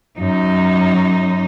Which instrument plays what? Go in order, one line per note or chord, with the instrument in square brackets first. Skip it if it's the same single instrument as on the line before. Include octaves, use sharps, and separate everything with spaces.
[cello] F#2 D#4